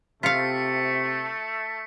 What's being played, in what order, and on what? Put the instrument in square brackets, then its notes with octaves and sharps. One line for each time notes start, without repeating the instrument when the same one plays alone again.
[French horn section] C3 [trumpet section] A3 [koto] F4 F5 [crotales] B6 C#7